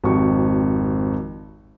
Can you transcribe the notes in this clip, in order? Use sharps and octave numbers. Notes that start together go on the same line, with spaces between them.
G#1 F2 F#4 G4 C#6